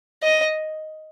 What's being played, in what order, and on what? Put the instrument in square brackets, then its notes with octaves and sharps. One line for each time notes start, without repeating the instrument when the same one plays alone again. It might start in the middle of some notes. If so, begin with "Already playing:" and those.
[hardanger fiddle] D#5